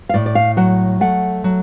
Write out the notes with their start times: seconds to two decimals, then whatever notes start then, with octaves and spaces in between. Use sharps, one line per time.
0.09 F5
0.14 A2 D5
0.26 D5
0.35 F5
0.57 F#3 F#5
1.01 A3 F#5
1.44 F#3